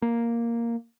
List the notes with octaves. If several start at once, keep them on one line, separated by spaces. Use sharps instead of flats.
A#3